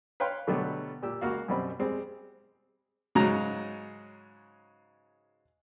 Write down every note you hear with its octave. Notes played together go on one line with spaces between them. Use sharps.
B4 C#5 F5 G5 B5 C6
B2 D3 F#3 G3 A3 B3
A#2 G4 E6
C#2 A#3 F#4 F5
F#2 B2 G3 C4 B5
G3 G#3 C4
G#2 C#3 F#3 A#5